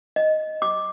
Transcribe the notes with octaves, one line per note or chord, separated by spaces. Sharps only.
D#5
D6